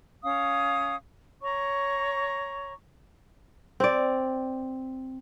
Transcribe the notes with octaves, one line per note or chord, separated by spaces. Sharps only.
C#4 F5 D#6
C#5 A#5 C#6
C4 D5